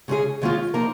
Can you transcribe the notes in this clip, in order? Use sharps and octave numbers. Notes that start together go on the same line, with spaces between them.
C#3 G#3 C#4 G#4
D#2 D#3 G#3 C#4 F4
F3 A#3 D#4 A#4